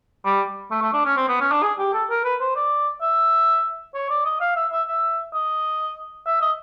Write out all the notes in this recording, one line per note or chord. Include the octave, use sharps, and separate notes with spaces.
G3
A3
A3
D4
C#4
C4
B3
C#4
D4
G#4
G4
A4
A#4
B4
C5
D5
E5
C#5
D5
D#5
F5
E5
E5
E5
D#5
E5
D#5